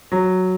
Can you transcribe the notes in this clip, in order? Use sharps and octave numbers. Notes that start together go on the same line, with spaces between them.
F#3